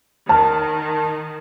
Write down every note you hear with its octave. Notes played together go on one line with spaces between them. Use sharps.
D#3 A5 F6